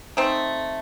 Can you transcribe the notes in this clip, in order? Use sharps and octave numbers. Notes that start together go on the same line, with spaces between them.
A3 C4 D#4